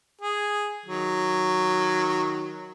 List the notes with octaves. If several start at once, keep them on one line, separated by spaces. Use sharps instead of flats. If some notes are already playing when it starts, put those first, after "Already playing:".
G#4
D#3 F#3